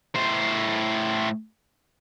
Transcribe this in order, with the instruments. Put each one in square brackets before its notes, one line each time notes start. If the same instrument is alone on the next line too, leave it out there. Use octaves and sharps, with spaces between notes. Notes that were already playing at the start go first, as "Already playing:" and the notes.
[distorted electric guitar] A2 C5